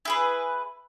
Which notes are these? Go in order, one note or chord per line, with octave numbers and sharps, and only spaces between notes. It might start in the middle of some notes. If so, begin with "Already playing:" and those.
E4 G#4 B4